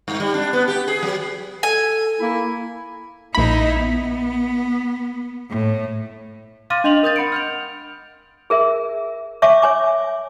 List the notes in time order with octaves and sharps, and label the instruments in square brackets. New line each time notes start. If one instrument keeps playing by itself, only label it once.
[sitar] G2
G3
D4
B3
G4
G#4
F#3
[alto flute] A4 [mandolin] G#5
[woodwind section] A#3 E4
[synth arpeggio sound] A#1 B5 [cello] D#4 E4
[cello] B3
A2
[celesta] F5 C6 D6 F6 A6 D#7
D4 D#5 C6 F7 F#7
A#4 D#6 G6 A6
F#5 B5 C#7 D7
F6 G6 F7
[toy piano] G#4 A#4 E5
C#5 E5 G#5 C#6 D6
C#5 G#5 D6